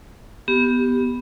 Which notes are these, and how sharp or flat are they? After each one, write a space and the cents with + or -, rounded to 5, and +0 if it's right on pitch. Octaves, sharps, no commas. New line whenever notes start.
B3 +0 G4 +0